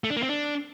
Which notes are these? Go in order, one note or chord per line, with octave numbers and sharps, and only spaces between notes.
A3
D4
A#3
C4
D4